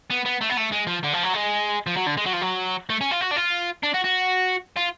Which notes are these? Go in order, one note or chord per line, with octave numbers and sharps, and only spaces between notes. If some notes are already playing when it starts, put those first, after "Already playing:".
B3
B3
A3
B3
A3
G#3
F3
D3
F3
F#3
G#3
F3
F#3
D3
G#3
F#3
F3
F#3
A3
C#4
F4
F#4
D4
F4
D4
F#4
F#4
F4